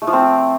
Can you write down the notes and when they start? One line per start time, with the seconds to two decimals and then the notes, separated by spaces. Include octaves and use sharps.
0.02 A3
0.07 F3
0.13 C4